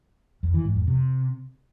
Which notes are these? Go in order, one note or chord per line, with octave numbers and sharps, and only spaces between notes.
F2
E3
G#2
F2
C3